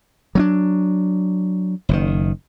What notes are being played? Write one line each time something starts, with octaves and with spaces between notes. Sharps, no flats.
F#3 C4 D4
F#1 A#2 D#3